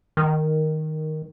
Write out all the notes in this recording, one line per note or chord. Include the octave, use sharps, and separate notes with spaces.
D#3